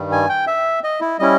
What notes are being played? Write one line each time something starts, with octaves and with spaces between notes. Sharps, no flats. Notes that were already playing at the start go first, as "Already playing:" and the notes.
Already playing: G2 D#3 G3
G#5
G5
E5
D#5
E4
G3 C#4 E4 D#5